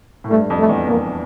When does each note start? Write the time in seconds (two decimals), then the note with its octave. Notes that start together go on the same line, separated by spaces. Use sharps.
0.24 A2
0.30 G2 A3
0.50 F2
0.59 A3
0.69 E2
0.88 F2 A#3